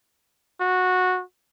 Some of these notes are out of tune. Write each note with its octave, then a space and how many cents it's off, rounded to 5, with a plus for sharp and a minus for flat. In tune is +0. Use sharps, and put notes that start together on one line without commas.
F#4 -15